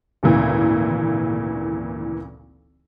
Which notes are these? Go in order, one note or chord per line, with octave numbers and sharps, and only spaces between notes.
G#1 D2 A#2 C#3 E3